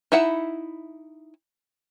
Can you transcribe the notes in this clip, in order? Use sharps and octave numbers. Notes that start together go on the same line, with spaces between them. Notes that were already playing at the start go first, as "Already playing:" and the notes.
D#4 E4 E5 F#5